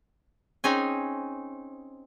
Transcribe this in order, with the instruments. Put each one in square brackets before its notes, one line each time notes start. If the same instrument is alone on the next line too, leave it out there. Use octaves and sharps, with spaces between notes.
[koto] C4 C#4 D#4 G#4 G#5